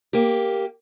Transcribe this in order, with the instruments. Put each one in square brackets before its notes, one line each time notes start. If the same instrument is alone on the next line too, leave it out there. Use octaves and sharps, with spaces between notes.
[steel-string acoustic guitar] A#3 G4